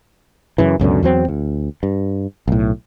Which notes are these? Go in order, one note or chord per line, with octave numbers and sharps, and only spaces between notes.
F#2 C#3 E3
C#2 F#2 B2 D3
E2 F#3 C4
D2
G2
B1 A2